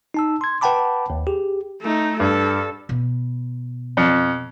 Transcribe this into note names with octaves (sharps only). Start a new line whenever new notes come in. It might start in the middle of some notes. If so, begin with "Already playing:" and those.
D#4 A5 E6
C6 G#6
B4 F#5 G5 A5 B5 D6
D#2
G4 G#4
A3 D#4
G2 A4
B2
F2